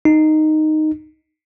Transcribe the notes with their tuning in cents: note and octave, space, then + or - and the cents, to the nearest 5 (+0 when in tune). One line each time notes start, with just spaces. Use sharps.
D#4 -5